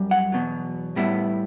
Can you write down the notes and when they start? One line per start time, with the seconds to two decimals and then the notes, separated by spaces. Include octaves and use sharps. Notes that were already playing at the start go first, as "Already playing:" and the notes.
Already playing: F#2 G3
0.11 F#5
0.32 E2 B2 F#3
0.96 A2 G3 B3 E4